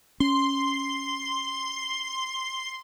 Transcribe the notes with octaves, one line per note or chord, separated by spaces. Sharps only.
C#4 C6